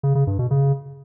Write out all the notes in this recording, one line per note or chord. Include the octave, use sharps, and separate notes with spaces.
C#3
C#3
G2
B2
C#3